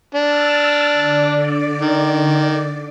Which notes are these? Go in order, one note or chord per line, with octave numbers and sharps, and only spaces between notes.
D4 E6 F6 A6
D3 D5
D#3